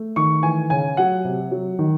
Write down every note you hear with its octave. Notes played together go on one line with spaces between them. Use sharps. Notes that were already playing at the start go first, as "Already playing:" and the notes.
Already playing: A3
D#3 C#6
E3 G#5
C#3 G#5
F#3 F#5
C3
F#3
D#3